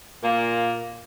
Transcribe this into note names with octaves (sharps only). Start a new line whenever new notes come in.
A#2 A#3